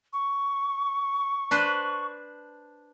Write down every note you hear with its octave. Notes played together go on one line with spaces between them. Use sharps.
C#6
D4 B4 C5